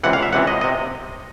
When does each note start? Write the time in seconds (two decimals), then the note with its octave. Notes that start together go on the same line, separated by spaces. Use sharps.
0.04 C#2 C3 E3 F#5
0.13 F5
0.23 E5
0.33 C#2 C3 E3 F#5
0.47 D#5
0.61 D#5
0.64 C3